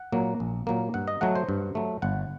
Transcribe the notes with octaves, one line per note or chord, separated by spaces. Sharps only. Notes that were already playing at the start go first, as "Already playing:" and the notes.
Already playing: F#5
A#2 F#3 A#3
A#1
A#2 F#3 A#3
G2 F#5
D#5
F#3 A3 F#5
C5
G2
F#3 A3
G1 F#5